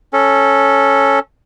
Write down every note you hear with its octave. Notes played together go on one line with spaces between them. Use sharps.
C#4 A4